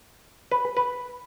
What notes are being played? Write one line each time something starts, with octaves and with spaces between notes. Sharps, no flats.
B4
B4